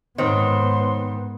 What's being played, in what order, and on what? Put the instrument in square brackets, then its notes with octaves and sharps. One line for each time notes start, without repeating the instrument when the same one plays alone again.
[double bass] G#2 B3 [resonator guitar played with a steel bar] D#3 C4 [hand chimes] D#4 C5 C#5 [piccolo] C6